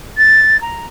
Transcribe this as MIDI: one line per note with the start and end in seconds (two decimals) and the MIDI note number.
0.17 0.60 93
0.61 0.86 82